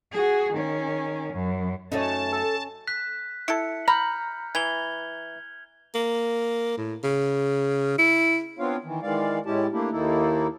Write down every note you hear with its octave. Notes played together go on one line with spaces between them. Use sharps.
F#4 G#4
D#3 C#4
F#2
F#2 A3 C#4 D#4 C#5 A5
A4
F#6 B6
E4 A4 C#7
A#5 B5 F6 G6
E3 G#6 F7 G7
A#3
A2
C#3
E4
B3 C4 D4 F4 C#5 F5
D#3 E3
D#3 E3 G#3 D5 F5
A2 G#3 C#4 E4 G4 A5
A3 A#3 D4 E4 G4
D#2 D#3 A#3 D#4 E4 A4